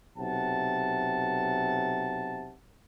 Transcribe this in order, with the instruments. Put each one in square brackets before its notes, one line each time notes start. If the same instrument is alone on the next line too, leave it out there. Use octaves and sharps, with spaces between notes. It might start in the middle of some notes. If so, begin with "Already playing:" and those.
[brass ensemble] B1 C3 F#5 A5